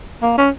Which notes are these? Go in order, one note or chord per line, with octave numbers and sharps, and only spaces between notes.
A#3
C#4